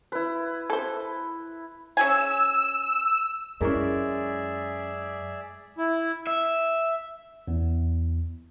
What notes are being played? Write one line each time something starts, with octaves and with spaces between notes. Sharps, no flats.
E4 B4
A4 C5
C#4 G#4 G#5 E6
F#2 G#3 C#4 E4 G#4 A#4 D5 E5
E4
E5
E2